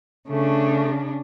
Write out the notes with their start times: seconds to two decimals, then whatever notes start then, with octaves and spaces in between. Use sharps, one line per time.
0.28 C#3 A3 D4